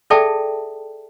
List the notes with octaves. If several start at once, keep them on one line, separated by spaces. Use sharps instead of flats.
G#4 A4 D5 E5 G5 A5